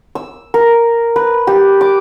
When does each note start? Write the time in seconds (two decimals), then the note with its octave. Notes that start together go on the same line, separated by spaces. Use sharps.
0.15 E6
0.54 A#4
1.16 B4
1.47 G4
1.81 D6